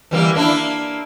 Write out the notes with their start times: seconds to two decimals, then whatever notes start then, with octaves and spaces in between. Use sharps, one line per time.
0.11 E3 G3 A#3
0.35 A#3 D4 E4